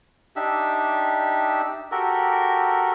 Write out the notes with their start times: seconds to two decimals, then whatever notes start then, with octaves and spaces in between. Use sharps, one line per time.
0.36 D4 D#4 G4 E5
1.92 F#4 G4 A4 A#4